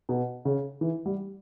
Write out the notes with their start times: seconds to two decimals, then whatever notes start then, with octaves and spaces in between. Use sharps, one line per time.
0.09 B2
0.45 C#3
0.81 E3
1.06 G3